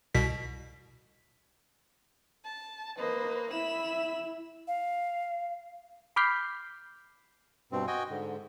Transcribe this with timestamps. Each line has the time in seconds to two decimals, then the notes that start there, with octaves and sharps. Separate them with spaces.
0.15 C2 B2 B6
2.45 A5
2.98 A#3 B4 C5 D#5
3.51 E4 E5 B5 E7
4.68 F5
6.16 B5 D6 F6 G6 B6 C7
7.72 G2 B2 C4
7.87 F#4 D#5 G5 G#5
8.10 G#2 D3